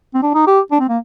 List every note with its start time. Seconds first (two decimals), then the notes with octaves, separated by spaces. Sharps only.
0.15 C4
0.23 D4
0.34 D#4
0.47 G4
0.72 D4
0.80 C4
0.89 A#3